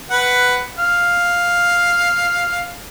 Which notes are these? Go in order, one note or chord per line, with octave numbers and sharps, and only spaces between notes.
B4 F#5
F5